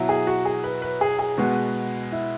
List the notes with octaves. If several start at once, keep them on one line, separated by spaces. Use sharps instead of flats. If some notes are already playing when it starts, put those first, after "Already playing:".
Already playing: B2 F#3 E4
G#4
F#4
G#4
B4
B4
G#4
G#4
B2 G#3 B3 F#4
E4